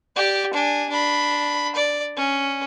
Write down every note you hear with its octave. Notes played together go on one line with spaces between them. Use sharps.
G4 D5
D4 G#5
D4 B5
D5
C#4